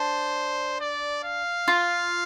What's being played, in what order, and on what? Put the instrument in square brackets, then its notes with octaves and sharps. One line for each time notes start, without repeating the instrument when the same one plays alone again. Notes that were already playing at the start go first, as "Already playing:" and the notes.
Already playing: [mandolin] D4 [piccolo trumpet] C5
[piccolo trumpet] D5
F5
[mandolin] F4